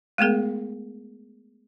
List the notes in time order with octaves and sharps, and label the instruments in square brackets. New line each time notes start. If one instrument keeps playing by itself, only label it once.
[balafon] G#3 A3 B3 G#4 A#4